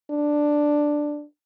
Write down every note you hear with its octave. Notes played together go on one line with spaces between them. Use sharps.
D4